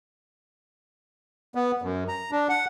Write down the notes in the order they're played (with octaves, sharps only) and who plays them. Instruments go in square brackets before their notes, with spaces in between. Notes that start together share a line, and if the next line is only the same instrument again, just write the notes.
[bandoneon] B3
F#2
A#5
D4
F#5